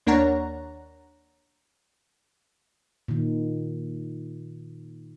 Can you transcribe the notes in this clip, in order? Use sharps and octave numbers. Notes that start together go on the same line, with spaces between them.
D#2 A#3 D4 C#5 F#5 A#5
A#2 D#3